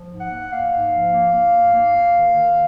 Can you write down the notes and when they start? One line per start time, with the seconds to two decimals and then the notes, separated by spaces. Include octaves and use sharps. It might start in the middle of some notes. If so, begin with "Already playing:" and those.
Already playing: F3
0.10 G#2
0.20 F#5
0.31 A#3
0.51 A#3 F5
0.72 G#2
0.93 F3
1.12 A#3
1.33 A#3
1.54 G#2
1.74 A#3
1.95 A#3
2.15 D#3
2.36 D#3